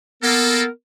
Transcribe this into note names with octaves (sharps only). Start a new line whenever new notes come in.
A#3 B3 A4 A#4